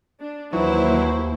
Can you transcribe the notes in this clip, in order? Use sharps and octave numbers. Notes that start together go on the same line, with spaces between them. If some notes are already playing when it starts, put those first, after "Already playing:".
D4
D#2 E3 F#3 E4 C5